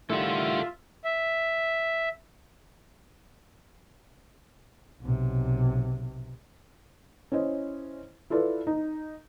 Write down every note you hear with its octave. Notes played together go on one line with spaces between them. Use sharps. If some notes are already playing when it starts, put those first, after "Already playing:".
A2 D#3 G3 F4 A4 E5 F#5
E5
B1 C3
C#4 E4 C5 D#5
E4 F4 A4 B4 D5
D#4